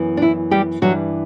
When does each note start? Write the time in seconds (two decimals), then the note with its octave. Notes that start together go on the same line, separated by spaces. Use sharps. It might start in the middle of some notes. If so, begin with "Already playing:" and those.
Already playing: F#2 E3 B3
0.17 D4
0.22 E4
0.51 G3 G4
0.81 G2 E3 F#3 G3 D4 F#4